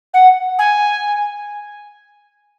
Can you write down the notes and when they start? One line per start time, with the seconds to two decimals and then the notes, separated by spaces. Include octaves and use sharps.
0.13 F#5
0.58 G#5